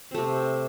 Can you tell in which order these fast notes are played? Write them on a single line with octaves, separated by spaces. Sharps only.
C4 A3 C3